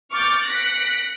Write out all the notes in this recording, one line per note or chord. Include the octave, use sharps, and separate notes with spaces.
C#6 D6 F6 G6 A6
F#6 A#6 B6 C#7 D7